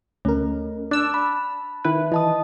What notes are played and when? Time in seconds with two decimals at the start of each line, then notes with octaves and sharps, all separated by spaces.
0.25 D2 A3 C#4 A#4
0.91 D4 A5 D6 E6 F#6
1.14 B5
1.85 D#3 E4 B4
2.12 E3 D#5 A5 D#6